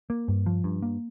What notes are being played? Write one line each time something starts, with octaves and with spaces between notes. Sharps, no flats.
A#3
G2
F3
G2
A#3